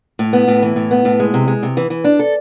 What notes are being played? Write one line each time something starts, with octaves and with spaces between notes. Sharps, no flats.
A2
B3
A2
E3
A2
B3
A2
G#3
C3
G#3
C3
E3
E3
D4
A4